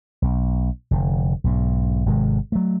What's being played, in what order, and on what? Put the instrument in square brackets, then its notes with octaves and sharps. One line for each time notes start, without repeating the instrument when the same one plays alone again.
[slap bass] B1
F1 D3
B1 G#2
G#1 C3 G#3
F#3 A3